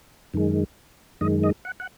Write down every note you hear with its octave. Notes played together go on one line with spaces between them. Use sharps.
F#2 D#3 G#3
F#2 D#3 G#3 D#5
D#5
F#5
F#5